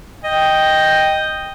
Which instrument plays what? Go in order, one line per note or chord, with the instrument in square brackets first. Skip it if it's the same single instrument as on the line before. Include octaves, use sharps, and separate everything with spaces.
[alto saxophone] D#5 [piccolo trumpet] G5